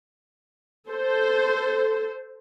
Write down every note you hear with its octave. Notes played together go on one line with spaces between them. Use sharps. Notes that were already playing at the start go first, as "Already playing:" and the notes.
A4 C5